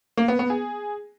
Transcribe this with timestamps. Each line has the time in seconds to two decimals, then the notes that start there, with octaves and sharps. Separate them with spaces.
0.17 A#3
0.28 B3
0.39 B3
0.50 G#4